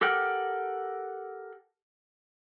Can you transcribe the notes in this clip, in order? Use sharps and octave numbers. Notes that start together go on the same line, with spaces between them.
G4 A4 A#4 F#5 G5